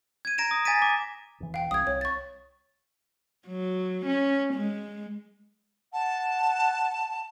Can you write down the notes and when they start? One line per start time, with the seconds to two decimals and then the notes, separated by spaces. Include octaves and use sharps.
0.25 G#6 D#7
0.38 A#5 A#6 D7 E7
0.51 D#6
0.65 G#5 A6 B6 D#7
0.82 D6
1.40 E1 E3
1.54 F5 G5
1.71 C2 D#6 G#6
1.87 C2 C#5
2.01 C#6 A6
3.47 F#3
4.06 C#4
4.54 G#3
5.93 F#5 A5